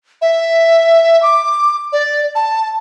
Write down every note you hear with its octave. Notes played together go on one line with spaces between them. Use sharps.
E5
D6
D5
A5